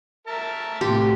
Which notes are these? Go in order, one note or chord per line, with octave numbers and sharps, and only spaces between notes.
A#4 E5 A5
A2 C3 F#4 G4 C6 D6